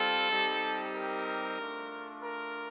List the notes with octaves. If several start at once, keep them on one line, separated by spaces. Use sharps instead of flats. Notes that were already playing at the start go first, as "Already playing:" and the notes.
Already playing: G3 C4 F4 A4
G3 C4 D#4 G4
A#4
A3 D4 F4
A#4